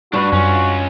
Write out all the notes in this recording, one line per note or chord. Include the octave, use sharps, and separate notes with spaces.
G2 D4 F#4 B4
F#2 C#4 F4